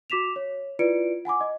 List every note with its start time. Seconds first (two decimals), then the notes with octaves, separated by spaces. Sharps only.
0.10 F#4 D6 B6 E7 F7
0.36 C#5
0.79 E4 F4 B4 D5 C#7 D7
1.25 F#5 G#5 B5 D6
1.41 D#5